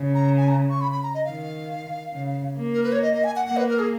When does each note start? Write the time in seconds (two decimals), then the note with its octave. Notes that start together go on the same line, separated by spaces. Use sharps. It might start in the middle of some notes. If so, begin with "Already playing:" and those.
Already playing: C#3
0.14 A#5
0.37 G#5
0.48 A#5
0.70 C#6
0.81 B5
0.92 B5
1.03 A#5
1.14 D#5
1.25 D#3 F5
2.13 C#3
2.58 A#3
2.74 A#4
2.84 B4
2.92 C#5
3.02 D#5
3.14 D#5
3.24 G#5
3.36 F#5
3.46 A#3 F#5
3.57 B4
3.69 A#4
3.79 G#4